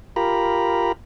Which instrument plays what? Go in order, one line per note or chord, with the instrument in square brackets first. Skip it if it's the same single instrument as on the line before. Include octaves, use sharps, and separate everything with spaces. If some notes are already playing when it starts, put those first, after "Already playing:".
[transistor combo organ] F4 G4 A#4 A#5 B5